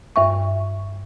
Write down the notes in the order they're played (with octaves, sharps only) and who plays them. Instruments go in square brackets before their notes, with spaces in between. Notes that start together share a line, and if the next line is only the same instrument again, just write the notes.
[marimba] G2 E5 C#6